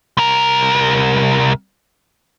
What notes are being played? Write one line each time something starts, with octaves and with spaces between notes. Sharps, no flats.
C2 A#4